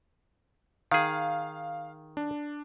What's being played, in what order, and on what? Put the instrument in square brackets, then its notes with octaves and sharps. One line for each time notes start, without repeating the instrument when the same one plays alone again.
[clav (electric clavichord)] D#3 G#4 [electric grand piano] F5
[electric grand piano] D4